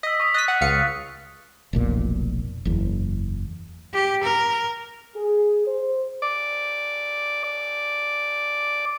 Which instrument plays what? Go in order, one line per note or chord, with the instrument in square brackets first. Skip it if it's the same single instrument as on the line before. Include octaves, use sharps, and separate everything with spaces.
[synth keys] D#5 [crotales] E6 B6
[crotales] C#6 D#6 B6
[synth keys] D#5 B6 [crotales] F#6 A6 D#7
[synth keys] F#5
C#2 F5 C#7
[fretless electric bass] F1 B1 A#2
F#1 E2
[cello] G4
A#4
[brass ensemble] G#4
C5
[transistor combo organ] D5
D5